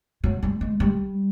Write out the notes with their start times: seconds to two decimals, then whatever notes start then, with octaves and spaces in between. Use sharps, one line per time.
0.24 F#3
0.43 G3
0.61 G#3
0.80 G3